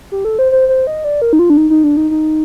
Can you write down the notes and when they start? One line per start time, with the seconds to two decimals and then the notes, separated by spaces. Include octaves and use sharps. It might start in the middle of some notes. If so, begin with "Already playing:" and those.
0.12 G4
0.25 A4
0.39 C5
0.52 C5
0.69 C5
0.87 D#5
1.04 D5
1.22 A#4
1.33 D#4
1.39 F4
1.50 D4
1.57 D#4
1.70 D#4
1.84 D4
1.97 D#4
2.11 D#4